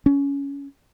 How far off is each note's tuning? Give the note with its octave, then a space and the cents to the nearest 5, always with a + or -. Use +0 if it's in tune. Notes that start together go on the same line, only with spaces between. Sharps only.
C#4 +15